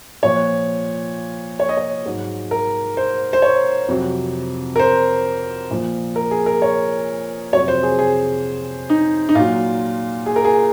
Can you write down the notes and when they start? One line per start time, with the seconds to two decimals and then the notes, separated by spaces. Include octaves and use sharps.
0.23 A#2 F3 C#5
1.60 C#5
1.69 D#5
1.77 C#5
2.06 G#2 F#3
2.51 A#4
2.97 C5
3.33 C5
3.42 C#5
3.88 F2 C3 F#3
4.76 A#4
4.79 C5
5.71 A#2 F3
6.16 A#4
6.31 G#4
6.46 A#4
6.62 C#5
7.53 F2 C3 F#3 C#5
7.68 C5
7.83 G#4
7.99 G#4
8.90 D#4
9.29 D#4
9.35 A#2 F#3 F4
10.26 G#4
10.36 A#4
10.45 G#4